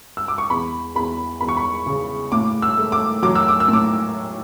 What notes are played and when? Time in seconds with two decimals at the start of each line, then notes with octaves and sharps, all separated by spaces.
0.17 E6
0.28 D6
0.38 C#6
0.50 E2 B5
0.95 E2 B5
1.41 E2 B5
1.49 C#6
1.57 B5
1.86 C#3
2.32 A2 D6
2.62 E6
2.78 A3
2.92 D6
3.23 F#3 D6
3.35 E6
3.48 D6
3.60 E6
3.69 A2 D6